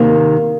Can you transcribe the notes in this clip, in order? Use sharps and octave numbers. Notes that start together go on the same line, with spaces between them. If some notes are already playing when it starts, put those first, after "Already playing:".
Already playing: C3 D#3 A#3